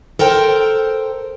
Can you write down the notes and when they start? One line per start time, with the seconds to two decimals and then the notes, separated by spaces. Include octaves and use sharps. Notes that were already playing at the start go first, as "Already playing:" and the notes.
0.19 A4 A#4 C5 G5